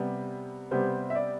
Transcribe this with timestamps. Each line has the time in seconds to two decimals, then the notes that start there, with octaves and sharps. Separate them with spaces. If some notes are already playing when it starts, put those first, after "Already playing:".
Already playing: C3 G3 B3
0.71 C3 G3 B3 C5
1.10 E5
1.15 D5